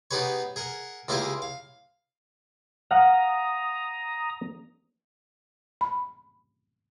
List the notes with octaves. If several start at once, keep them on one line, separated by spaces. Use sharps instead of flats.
B3 D#4 G4 G#4 B4 C#5
G#4 A#4 F#5
C#2 A#3 E4 G4 G#4 D#5
F5
F5 F#5 A#5 D#6
B5